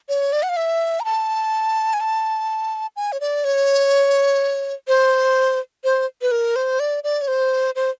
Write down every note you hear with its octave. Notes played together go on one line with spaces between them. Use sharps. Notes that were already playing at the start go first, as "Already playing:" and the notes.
C#5
D5
F#5
F5
E5
A#5
A5
G#5
A5
G#5
C#5
D5
C#5
C5
C5
B4
A#4
C5
D5
D5
C#5
C5
C5